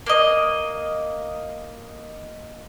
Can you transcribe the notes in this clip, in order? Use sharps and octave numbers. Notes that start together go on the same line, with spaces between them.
A#3 D#5